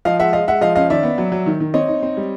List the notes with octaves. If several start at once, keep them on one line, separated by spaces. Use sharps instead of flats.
F3 D#5 F5
G#3 E5 F#5
G#3 D#5 F5
G#3 E5 F#5
F3 D#5 F5
C#4 D#5 F5
D#3 D5 E5
B3
F#3
F#3
D#3
D#3
C4 C#5 D#5
D#4
C4
G3